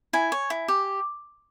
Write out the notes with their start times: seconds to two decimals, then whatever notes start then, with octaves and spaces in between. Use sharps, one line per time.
0.13 E4 G#5
0.32 C#5
0.50 E4
0.68 G4